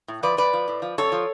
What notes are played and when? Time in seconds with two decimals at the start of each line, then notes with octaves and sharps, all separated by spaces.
0.08 A2
0.23 F3 B4 D5
0.37 F2 B4 D5
0.53 F3
0.68 A2
0.82 F3
0.98 F#2 A4 C#5
1.12 F3